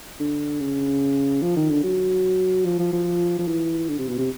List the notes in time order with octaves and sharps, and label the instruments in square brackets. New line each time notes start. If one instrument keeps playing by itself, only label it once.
[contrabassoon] D3
C#3
F3
D#3
D3
F#3
F3
F3
F3
F3
E3
D3
C3
B2
C3